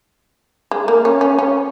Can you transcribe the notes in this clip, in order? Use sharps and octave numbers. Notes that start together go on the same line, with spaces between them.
G#3
A#3
C#4
C#4
C#4